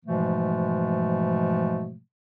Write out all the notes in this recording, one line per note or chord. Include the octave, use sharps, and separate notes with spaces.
G#2 B2 E3 F3 G#3 A3